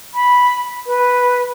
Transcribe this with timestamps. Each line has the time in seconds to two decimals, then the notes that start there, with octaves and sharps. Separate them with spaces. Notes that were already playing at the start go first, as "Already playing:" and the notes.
0.14 B5
0.87 B4